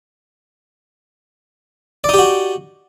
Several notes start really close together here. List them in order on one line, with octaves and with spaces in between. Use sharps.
D5 D#4 G4 F#4